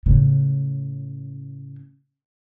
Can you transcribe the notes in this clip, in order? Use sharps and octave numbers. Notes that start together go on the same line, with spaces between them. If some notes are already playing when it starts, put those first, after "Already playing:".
A2 C#3